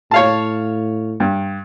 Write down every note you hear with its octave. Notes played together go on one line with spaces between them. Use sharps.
A2 C#5 F5 A5
G2